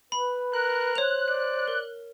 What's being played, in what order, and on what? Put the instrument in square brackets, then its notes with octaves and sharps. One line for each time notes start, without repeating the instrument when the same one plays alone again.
[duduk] B4 [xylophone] B5
[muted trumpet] A#4 [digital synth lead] F#6
[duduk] C5 [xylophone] C#5 F7
[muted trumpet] D5
[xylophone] A#4